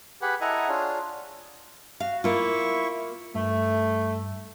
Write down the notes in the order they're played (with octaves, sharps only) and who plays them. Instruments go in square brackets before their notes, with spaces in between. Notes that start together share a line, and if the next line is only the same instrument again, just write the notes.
[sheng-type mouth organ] G4 G#4 B4 F#5 B5
E4 A4 D#5 F#5 G#5 A#5
D4 F4 G#4 C#5
[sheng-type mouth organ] F#4 [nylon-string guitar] F5
[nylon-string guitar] A#3 F4 [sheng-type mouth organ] E4 E5 C#6
[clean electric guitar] G2 [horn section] A3